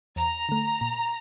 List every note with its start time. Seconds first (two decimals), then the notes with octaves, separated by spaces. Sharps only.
0.16 E2 A#5
0.49 D3 A3
0.81 A#2